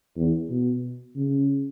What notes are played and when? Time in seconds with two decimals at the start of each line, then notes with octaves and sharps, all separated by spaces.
0.16 E2
0.50 B2
1.16 C#3